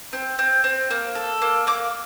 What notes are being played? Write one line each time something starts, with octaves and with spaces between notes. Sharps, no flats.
C4
C4
C4
A#3
A4
A#3
A#3 D6